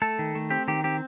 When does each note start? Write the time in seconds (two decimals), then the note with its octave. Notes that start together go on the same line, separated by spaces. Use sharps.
0.02 A3 A4
0.19 D#3
0.35 A3
0.50 C4 G4
0.68 D#3 G4
0.84 C4 G4